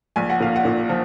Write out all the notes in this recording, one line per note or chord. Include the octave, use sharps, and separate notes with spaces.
A#1 G#5
F#5
A#2 F5
F#5
A#2
F3